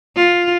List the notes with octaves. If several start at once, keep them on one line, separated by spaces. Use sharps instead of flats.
F4